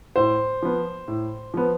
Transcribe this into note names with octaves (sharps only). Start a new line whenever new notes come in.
A2 C5
F3 B3
A2
F3 B3